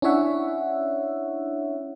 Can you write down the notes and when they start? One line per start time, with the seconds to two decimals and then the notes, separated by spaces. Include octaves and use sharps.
0.02 C#4 D4 E4 C#5 E5 F#5